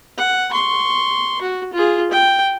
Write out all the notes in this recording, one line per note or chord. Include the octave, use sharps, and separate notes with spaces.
F#5
C6 C#6
F#4
F4 G#4
G5